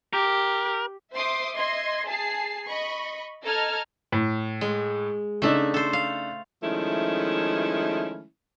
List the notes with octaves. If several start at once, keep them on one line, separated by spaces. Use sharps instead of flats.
G4 A#4
C5 E5 C6 D6 D#6
D#5 E5 C6 G#6
G#4 A5 C7
D#5 B5 C#6
A4 D#5 A5 A#5 F6 G#6
A2
G#3
C#3 A3 D4 D#4 E5
A4 C5
F5
D#3 F3 G#3 A3 C#4 E4